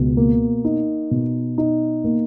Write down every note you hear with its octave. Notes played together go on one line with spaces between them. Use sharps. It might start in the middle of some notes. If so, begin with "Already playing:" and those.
Already playing: C#2 B2
A#3
D#4
B2
D#4
A#3